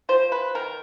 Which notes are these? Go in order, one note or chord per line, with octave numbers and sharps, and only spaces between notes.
F3 C5
B4
D#3 A#4